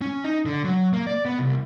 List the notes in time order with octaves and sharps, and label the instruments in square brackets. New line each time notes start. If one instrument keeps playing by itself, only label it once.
[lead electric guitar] C#4
D#4
D3
F#3
A#3
D5
B3
C2